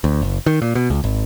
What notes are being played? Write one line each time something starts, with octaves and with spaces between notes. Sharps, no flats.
D2
F#1
D#3
A#2
B2
C#2
G#1